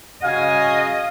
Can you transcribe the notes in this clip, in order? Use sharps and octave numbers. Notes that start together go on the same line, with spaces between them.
C#3 F#4 D#5 F5 G#5